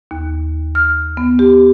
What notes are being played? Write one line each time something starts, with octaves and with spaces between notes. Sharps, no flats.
D#2
F6
B3
G4